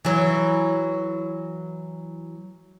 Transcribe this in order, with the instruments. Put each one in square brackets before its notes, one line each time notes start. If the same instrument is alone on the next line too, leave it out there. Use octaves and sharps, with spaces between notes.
[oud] E3 F#3